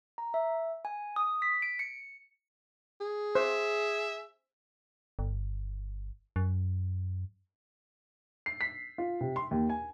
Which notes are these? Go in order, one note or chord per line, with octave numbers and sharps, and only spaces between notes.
A#5
E5
G#5
D#6
B6
D7
C#7
G#4
C5 E5
G1
F#2
C7
B6
F4
C3
C6
D#2
G#5